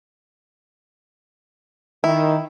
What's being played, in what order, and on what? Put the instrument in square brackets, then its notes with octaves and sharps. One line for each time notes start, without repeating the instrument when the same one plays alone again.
[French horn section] D#3 [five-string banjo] E4